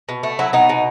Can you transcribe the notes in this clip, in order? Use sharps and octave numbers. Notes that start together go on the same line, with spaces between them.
B2
A3
F#3 E4
B2 D#4
B2